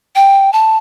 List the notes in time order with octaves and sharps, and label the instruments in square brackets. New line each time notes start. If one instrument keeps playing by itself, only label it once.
[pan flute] G5
A5